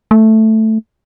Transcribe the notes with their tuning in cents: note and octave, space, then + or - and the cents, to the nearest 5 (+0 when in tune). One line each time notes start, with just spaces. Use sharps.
A3 +0